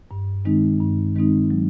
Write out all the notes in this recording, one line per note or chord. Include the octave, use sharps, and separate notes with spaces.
G2
D#3 G#3 C4 D#4
G2
D#3 G#3 C4 D#4
F#3